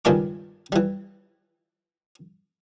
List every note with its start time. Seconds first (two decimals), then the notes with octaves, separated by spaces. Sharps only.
0.05 C#2 G2 D#3 G3 G#5 D6
0.72 E3 G3